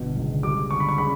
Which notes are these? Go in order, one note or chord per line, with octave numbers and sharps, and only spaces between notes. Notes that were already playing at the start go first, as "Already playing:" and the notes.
Already playing: G1 B2
C#2
G3 D6
D3 C#6
B5
C#6
C#3 B5